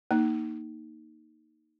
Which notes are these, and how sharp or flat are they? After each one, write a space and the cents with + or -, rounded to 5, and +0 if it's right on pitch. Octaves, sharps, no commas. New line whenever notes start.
A#3 +0 D#4 +0